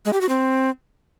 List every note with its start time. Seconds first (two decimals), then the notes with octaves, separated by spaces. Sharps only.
0.05 G#3
0.13 G4
0.21 F#4
0.29 C4